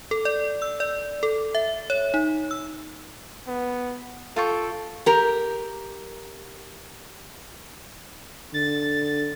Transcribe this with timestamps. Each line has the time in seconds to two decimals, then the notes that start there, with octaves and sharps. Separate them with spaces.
0.11 A4
0.25 D5
0.62 E6
0.80 D5
1.23 A4
1.55 E5
1.90 C#5
2.14 D#4
2.51 E6
3.47 B3
4.36 F4 A4 G5 C#6
5.06 G4 A#4
8.54 D3 A6